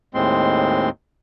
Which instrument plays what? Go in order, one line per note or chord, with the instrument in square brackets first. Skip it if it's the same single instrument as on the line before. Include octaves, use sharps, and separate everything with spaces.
[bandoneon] D#2 A2 G#3 C4 C6